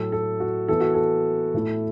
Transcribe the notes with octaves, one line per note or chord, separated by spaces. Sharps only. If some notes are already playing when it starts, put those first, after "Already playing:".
Already playing: A2 F#3 A3 A4
A4
F#4
E3 B3 E4 A4
F#4
A4
A2 A3 E4